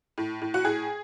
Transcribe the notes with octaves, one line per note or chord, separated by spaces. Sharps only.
A2
A2
F#4
A2 G#4